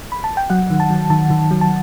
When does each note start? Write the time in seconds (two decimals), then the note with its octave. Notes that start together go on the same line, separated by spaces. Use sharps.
0.12 B5
0.24 A5
0.37 G5
0.50 F#3 F#5
0.70 D#3
0.80 A5
0.90 F#3
1.10 D#3 A5
1.30 D#3
1.51 F#3
1.61 A5